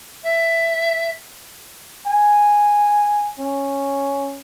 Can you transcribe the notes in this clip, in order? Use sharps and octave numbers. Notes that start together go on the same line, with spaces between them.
E5
G#5
C#4